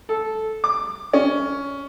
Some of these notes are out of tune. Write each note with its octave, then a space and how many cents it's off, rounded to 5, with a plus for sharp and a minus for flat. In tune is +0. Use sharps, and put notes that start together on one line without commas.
A4 -10
D6 +10
C#4 +15